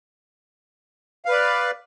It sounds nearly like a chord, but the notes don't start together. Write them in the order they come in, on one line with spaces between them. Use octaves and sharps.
F5 B4 D5